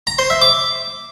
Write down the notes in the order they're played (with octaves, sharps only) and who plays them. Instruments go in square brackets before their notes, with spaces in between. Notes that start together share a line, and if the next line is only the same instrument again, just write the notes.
[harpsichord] A#5
C5
E5
D6